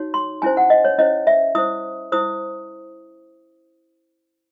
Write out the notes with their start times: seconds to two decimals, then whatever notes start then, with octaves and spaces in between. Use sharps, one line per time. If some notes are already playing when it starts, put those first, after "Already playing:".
Already playing: D#4 F#4 C#5
0.14 C6
0.42 C#4 E4 C5 G#5
0.57 F#5
0.70 D#5
0.85 C#5
0.98 C#4 E4 C5 D#5
1.27 E5
1.55 E4 C5 D#6
2.12 E4 C5 D#6